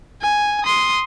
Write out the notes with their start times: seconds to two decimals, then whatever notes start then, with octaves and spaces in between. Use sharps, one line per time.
0.22 G#5
0.64 C6 D#6